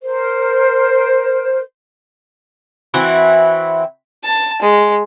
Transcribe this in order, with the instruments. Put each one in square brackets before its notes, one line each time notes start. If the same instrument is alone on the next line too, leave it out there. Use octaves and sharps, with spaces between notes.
[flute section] A#4 C5
[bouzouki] E3 C4 E4 F#4
[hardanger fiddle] A5
G#3